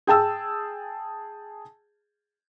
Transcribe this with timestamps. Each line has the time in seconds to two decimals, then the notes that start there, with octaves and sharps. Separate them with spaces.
0.07 G#4 G5 A5 E6